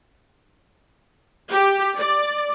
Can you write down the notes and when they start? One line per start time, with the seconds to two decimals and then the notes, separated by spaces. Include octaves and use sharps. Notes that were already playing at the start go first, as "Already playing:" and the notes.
1.51 G4
1.97 D5